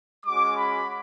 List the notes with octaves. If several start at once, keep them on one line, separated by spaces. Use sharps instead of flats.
G#3 C#4 F#4 D6
B5